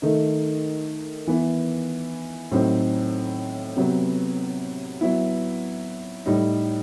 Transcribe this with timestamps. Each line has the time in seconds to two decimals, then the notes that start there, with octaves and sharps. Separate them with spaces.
0.02 D#3 A3 D#4
1.27 E3 B3 E4
2.51 A2 F#3 C4 D#4
3.77 C3 F#3 B3
5.01 F#3 B3 E4
6.26 A2 G3 D#4